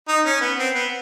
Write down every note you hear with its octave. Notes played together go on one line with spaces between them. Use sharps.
D#4
C#4
B3
C4
B3